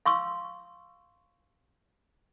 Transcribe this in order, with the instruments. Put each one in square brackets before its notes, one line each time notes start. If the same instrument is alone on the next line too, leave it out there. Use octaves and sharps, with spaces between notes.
[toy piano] F5 C6 C#6 E6